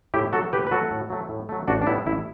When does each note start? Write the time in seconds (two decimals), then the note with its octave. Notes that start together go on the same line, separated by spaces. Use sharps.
0.14 A2 E4 G4
0.33 F#3 A3 F#4 A4
0.52 A2 G4 B4
0.67 B4
0.71 F#3 A3 F#4 A4
0.91 A2
1.10 F#3 A3
1.29 A2
1.49 F#3 A3
1.68 A1 D4 F#4
1.82 D4
1.87 A2 G3 B3 E4
2.06 A1 E4